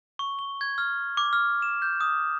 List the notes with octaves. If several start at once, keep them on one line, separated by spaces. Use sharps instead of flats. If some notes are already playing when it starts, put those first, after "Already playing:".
C#6
G7
G#6
F6
D6
F6
E7
G6
D#6